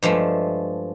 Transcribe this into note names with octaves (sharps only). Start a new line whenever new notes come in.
G2 F3 G#3 A3